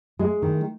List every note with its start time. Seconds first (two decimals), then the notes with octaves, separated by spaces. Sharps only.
0.19 G#3
0.42 D#3